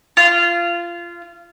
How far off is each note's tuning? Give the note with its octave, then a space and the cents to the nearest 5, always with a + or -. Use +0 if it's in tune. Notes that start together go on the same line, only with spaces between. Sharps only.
F4 -20